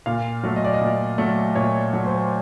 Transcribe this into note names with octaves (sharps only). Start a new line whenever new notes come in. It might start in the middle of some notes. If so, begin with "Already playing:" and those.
A#2 F5
F#3 A3
D#5
D5
D#5
A#2
F#3 A3
A#2 C#5
F#3 A3
C5